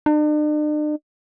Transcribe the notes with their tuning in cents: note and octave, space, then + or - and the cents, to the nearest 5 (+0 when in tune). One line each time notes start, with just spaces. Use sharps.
D4 +45